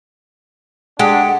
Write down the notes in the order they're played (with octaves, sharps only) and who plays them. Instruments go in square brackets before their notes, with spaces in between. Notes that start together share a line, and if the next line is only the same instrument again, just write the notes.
[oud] G#3 [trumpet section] D4 [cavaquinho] G4 [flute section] F#5